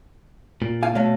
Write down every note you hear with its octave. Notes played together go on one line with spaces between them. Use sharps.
A#2
F5 G#5
B2 A3 C#5 F5